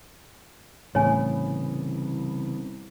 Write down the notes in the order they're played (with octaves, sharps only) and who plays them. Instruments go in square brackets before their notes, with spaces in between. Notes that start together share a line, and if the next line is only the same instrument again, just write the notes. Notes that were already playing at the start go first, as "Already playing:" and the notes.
[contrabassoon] C2 [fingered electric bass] A2 [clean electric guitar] C#3 E3 B3 [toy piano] C#5 G#5